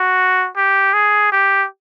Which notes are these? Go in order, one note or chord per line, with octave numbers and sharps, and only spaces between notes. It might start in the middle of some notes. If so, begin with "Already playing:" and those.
Already playing: F#4
G4
G#4
G4